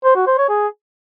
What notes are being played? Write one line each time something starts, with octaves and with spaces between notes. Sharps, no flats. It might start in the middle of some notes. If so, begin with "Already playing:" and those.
C5
F#4
C5
C#5
G#4